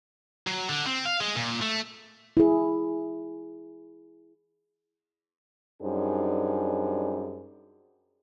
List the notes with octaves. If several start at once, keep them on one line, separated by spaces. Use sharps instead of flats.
F#3
D3
C4
F5
G#3
A#2
A3
E4 G#4
F#2 G3 D4 D#4 G#4 C5